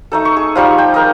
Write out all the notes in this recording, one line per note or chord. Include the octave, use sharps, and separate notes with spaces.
A3 D#4 A4
C#6
G#4
F3 G3 D#4 C#6
G5
G#4 A#4 D#5